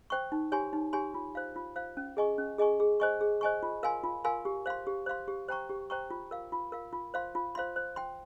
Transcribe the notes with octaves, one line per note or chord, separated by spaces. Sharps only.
C5 G5 C#6
D#4
G4 C#5 G#5 C6
D#4
G4 C#5 G#5 C6
F4
C5 F5
F4
C5 F5
C#4
G#4 D#5 G#5 C#6
C#4
G#4 D#5 G#5 C#6
G#4
C5 D#5 G#5 C#6
G#4
C5 D#5 G#5 C#6
F4
A#4 F5 G#5 C6
F4
A#4 F5 G#5 C6
G4
C5 F5 C6
G4
C5 F5 C6
G4
C5 G5 A#5 C#6
G4
C5 G5 A#5 C#6
F4
A#4 F5
F4
A#4 F5
F4
C5 F5 C6
F4
C5 F5 C6
C5
G5 C6